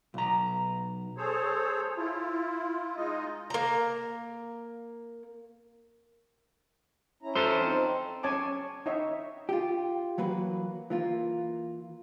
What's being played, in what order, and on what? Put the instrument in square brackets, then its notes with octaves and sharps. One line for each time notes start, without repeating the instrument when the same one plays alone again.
[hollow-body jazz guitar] B1 A#5
[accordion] G#4 A4 C5 C#5
E4 F4
G#3 D#4 F4 D#5
[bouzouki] A#3 A#5
[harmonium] C#4 E4 A#5
[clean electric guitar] A4 C5
[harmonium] F3 C4 D#4
[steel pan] C#4 C#5 G#5 A5 D6
D#4 C#5 E5
[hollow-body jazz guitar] F4 G4
E3 F#3 A#3 B4
E3 A#3 F4